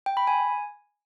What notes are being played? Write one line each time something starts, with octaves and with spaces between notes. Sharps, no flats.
G5
B5
G#5